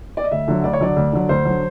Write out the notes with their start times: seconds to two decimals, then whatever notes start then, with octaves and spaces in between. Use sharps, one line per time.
0.17 D5
0.24 D#5
0.31 D2 E5
0.48 D3 F#3
0.64 D2 D5
0.73 C#5
0.80 D3 F#3 D5
0.96 D2
1.12 D3 F#3
1.29 D2 C5
1.45 D3 F#3